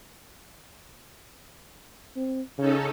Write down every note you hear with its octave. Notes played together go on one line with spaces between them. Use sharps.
C4
C#3 C#4 D#4 A4